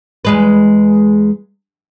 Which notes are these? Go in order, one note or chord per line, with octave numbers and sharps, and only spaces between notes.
E2 G#3 B4